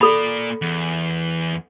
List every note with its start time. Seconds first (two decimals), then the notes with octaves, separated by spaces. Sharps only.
0.01 A#3 A4 D5 B5
0.62 E2